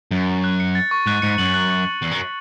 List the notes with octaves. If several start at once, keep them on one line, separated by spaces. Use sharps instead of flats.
F#2 A6
C#6
F#6
C#7
A6
C#6
G#2 F#6
G#2 C#7
F#2 F#7
F#6
C#7
F#6
E2 F#7
F#2
F#6